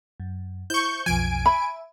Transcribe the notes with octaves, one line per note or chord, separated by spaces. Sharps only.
F#2
E4 C5 C#6 G6
B1 F2 F3 G#5 D7
E5 B5